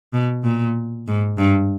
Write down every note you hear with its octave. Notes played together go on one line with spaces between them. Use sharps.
B2
A#2
G#2
G2